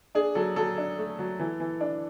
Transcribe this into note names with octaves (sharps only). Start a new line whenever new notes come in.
D4 G#4
F#3 A4
F#3 A4
D4
A3
F#3
E3
E3
D4